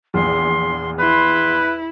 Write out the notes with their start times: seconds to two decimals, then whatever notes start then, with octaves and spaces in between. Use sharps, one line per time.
0.14 A#1 E2 C6
0.99 E4 B4 C6